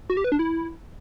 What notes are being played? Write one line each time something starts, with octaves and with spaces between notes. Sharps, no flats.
F#4
G4
B4
D4
E4